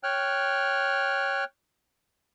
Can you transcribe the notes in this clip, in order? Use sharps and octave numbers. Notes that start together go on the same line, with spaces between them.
C#5 G5 F6 F#6